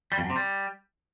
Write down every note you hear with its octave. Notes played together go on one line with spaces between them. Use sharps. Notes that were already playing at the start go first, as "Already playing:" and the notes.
G3
F2
F#2
C3
G3